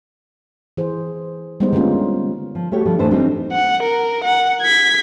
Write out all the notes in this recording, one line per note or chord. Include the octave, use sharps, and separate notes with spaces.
E3 G#4 C5
G3 G#3 B3 D#4 C5
D3 G#3 A#3 C#4 F4
F3
A3 F#4 G4 C#5
D3 F3 G3
F2 G#2 E3 A3 D4 C5
E3 F#3 G3 C4 D4 D#4
F#5
A#4
F#5
G#6 B6